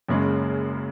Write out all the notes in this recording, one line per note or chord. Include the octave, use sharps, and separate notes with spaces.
F#1 F#2 C#3 G#3